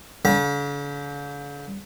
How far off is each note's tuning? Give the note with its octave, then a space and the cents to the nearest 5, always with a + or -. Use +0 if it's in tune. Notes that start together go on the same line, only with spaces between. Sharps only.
D3 -45 B5 -40